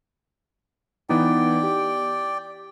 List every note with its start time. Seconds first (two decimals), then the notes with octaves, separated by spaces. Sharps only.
1.09 E3 B3 D#4 D5 G5
1.63 G4